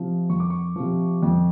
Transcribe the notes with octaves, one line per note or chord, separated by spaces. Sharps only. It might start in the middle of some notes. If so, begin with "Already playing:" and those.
Already playing: C3 F3
F2 C#6
D6
C#6
C3 F3
F2